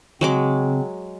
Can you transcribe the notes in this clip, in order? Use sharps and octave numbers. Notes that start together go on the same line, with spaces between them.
C#3 F#3 G#3 C4 D6